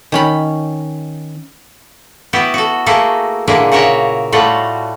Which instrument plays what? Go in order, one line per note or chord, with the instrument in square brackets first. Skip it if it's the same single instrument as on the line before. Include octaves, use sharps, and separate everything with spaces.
[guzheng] D#3 C#4 B5
[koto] B3 E4 F#4 G4
F#4 A4
A3 A#3 E4 F#4 G#4 A4
A#2 D3 G#3 A#3 E4 G#4
C#3 F#4 A#4 C#5 E5 A#5
A2 G3 A3 F4 F#4 F#5